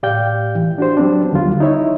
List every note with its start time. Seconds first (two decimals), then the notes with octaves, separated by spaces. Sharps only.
0.03 A2 G4 D5 F5 G5 G6
0.55 E3
0.78 D4 F#4 G4 C5
0.97 F#3 B3 C4 D4
1.33 D#2 D3 F#3 G3 F4
1.60 D#4 E4 C#5 E5